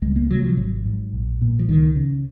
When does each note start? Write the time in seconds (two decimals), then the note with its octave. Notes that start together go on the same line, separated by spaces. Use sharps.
0.02 C#2 G#3
0.16 A#3
0.30 C3 F#3
0.43 F3
0.57 G#1 F#3
0.85 G#2
1.13 A#1
1.41 A#2
1.59 F3
1.68 C#2 D#3
1.96 C#3